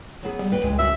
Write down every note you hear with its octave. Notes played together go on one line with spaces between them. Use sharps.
F#3 B3 G#4
G3
D#2 B4 G5
C#2 E3 G#3
F#2 F#4 E5